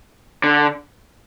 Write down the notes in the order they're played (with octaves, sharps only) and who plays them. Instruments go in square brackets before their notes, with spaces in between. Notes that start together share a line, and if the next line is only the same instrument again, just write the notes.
[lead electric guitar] D3